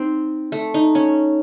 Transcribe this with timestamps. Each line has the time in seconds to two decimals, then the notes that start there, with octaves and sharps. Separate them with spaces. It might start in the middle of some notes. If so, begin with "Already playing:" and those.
Already playing: C4 D#4
0.52 A3
0.74 D#4
0.95 C#4